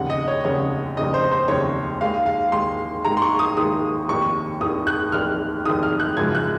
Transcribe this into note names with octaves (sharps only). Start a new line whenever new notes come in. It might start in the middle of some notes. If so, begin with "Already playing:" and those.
Already playing: F1 D#2 C#3 F#5
D#5
C#5
F1 D#2 C#3 C#5
F1 D#2 C#3 D#5
C5
C5
F1 D#2 C#3 C#5
D#2 D#3 G#3 F5
F5
D#2 D#3 G#3 C6
D#2 D#3 G#3 A#5
C6
C#6
D#6
D#2 D#3 G#3 D#6
F1 D#2 D#3 C#6
F1 D#2 D#3 D#6
F#6
F1 D#2 D#3 F6
F1 D#2 D#3 D#6
F6
F#6
G#1 F#2 C#3 F3 G#3 G#6
F#6